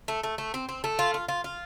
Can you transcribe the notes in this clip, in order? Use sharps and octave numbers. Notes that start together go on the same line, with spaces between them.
A3
A3
A3
C4
C4
A3
F4
F4
F4
F4